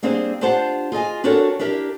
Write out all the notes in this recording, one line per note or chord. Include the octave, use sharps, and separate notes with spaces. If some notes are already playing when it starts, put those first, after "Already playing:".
G3 A#3 C4 D4 G#4 C5
D4 F4 G4 C5 F#5 A5
F4 G#4 D#5 G#5
D4 F#4 G4 A4 A#4 C#5
D4 E4 G4 A#4 E5